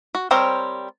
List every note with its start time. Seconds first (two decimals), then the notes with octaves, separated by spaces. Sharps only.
0.15 F#4
0.31 G3 C4 A#4 C5 C#5